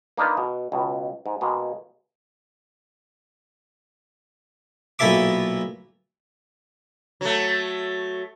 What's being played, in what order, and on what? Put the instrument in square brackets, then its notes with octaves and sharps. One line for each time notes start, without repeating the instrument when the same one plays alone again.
[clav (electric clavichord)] A#3 D4 D#4 F4 B4
B2
C#2 B2
G#2
B2 G#3 A#3
[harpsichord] B1 A#2 E4 A4 E5 D6
[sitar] F#3 A3